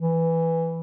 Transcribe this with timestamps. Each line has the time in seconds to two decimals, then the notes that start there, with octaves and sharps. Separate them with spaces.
0.01 E3